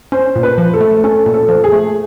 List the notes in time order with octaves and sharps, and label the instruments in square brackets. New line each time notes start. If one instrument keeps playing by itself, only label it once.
[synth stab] C#4 [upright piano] C5
[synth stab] A#2
[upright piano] B4
[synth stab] F3
[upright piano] A4
[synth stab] A3
[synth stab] C#4 [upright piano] A4
[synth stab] A#2
[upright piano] A4
[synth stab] F3
[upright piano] G#4
[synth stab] A3